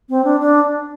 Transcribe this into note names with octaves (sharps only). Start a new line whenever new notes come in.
C4
D4
D4